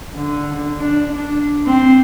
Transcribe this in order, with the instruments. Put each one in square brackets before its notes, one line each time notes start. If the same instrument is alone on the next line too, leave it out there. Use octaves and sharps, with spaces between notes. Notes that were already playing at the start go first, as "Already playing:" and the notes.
[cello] D3
D4
D4
C4